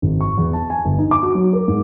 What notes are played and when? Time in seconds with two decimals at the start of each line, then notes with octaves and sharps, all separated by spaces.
0.02 G#1
0.21 C#6
0.38 E2
0.53 A5
0.70 G#5
0.85 G1
0.98 D#4
1.11 D6
1.23 F#4
1.35 F#3
1.53 A#4
1.68 G#2